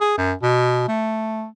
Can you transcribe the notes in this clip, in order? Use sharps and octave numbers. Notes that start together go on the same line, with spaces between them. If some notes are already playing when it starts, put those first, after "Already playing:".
G#4
F#2
B2
A3